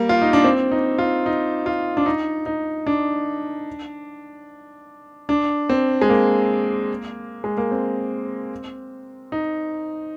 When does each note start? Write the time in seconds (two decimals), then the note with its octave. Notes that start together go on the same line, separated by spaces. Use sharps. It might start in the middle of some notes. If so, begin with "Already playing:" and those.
Already playing: G3 A#3
0.09 F4
0.22 D#4
0.33 D4
0.44 C4
0.71 D#4
0.98 F4
1.26 D#4
1.66 F4
1.97 D4
2.06 D#4
2.46 D#4
2.87 D4
5.29 D4
5.69 C4
6.01 G#3
6.09 A#3
7.44 G#3
7.57 A#3
7.71 C4
9.32 D#4